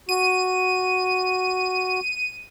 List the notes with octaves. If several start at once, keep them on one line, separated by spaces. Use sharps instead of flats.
F#4 D#7